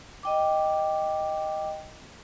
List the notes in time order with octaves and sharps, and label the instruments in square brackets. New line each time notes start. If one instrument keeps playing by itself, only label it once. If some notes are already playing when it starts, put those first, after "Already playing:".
[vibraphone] D#5 G5 D6